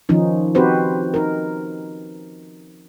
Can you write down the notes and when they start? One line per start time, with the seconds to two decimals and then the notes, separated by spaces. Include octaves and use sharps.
0.09 D#3 F3 C#4 D#4
0.55 C4 D#4 F#4 G4 B4 C5
1.14 D#4 A#4